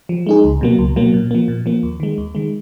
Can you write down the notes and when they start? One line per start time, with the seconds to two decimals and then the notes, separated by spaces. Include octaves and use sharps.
0.09 F3
0.26 G#3 D#4 G#4
0.44 C#2
0.61 B2 F#3 A#3
0.78 C#2
0.96 B2 F#3 A#3
1.14 A#2
1.31 F3 A#3
1.48 A#2
1.66 F3 A#3
1.83 D#2
2.00 D#3 G#3
2.18 D#2
2.35 D#3 G#3